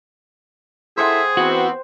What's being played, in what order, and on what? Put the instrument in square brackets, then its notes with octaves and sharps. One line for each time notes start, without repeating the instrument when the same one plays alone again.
[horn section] E4 A4 E5 [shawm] G#4 [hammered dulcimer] C5 F#5 G5
[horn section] E3 B3 C4 [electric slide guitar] F#4